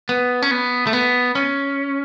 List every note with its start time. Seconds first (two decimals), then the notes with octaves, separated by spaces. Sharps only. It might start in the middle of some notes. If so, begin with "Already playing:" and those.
0.09 B3
0.42 C#4
0.51 B3
0.87 A3
0.93 B3
1.35 C#4